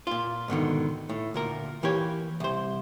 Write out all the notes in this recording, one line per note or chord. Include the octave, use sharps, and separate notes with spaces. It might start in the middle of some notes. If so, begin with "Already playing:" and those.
A#2 F4
G#2 B2 D3 D#3
A2
D2 A#2 A#4
E3 A#3 G4 C#5
C2 C5